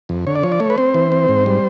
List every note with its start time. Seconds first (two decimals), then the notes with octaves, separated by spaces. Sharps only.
0.09 F2
0.27 D3 C#5
0.35 D5
0.43 F3 C#5
0.52 D5
0.60 A3 C#5
0.70 B4
0.78 C4 C5
0.94 E3
1.12 C4
1.28 G#2
1.46 G3